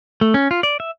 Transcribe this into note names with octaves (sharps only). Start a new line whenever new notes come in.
A3
C#4
F4
D5
E5